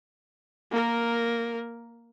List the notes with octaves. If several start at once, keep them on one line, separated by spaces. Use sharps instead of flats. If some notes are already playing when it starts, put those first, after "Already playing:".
A#3 A#4